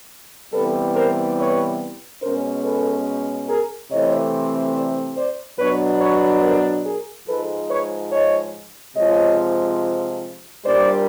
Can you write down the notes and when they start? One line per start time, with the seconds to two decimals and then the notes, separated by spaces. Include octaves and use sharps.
0.53 C3 E3 G3 B3 A4 B4
0.95 A#4 C5
1.37 B4 C#5
2.21 B2 G#3 C#4 A#4 C5
2.64 A4 B4
3.48 G#4 A#4
3.90 C3 E3 A3 C4 C#5 D#5
4.75 C5 D5
5.16 C5 D5
5.59 B2 F#3 B3 D4 B4 C#5
6.01 B4 C#5
6.43 A#4 C5
6.85 G#4 A#4
7.27 G#2 F3 G#3 A4 B4
7.70 B4 C#5
8.12 C#5 D#5
8.96 C3 F3 G#3 C#5 D#5
10.65 A#2 G3 A#3 D4 C5 D5